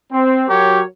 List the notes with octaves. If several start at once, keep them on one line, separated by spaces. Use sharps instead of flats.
C4
F#3 G4 A#4 C#5